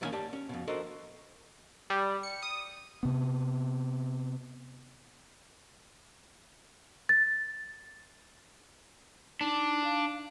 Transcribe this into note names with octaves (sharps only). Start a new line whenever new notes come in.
E2 A2 D#3 A#3 C#4 G#5
G4 D5 A5
C#4
F2 B2
D4 F#4 A4 A#4 C5 D#5
G3
C#7
D#6
C3 B3
A6
D4 D#4
F5